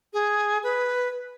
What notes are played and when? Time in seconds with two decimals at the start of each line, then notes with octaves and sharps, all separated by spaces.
0.13 G#4
0.63 B4